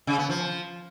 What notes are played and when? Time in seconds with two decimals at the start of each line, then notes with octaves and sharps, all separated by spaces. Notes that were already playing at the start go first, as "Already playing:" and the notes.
0.07 C#3
0.18 B3
0.29 F3